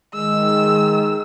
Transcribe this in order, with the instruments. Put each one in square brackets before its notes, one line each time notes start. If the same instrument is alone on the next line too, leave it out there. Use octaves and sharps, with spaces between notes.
[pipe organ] D#3 [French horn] G#3 [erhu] E6